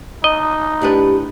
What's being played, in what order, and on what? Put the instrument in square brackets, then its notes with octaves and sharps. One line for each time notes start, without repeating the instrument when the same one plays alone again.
[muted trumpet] D#4 [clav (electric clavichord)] D#5
[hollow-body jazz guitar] A2 D4 B4 [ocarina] G4